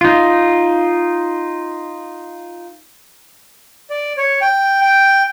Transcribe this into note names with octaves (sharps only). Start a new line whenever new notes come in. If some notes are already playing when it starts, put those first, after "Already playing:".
D#4 F4
D5
C#5
G5
G5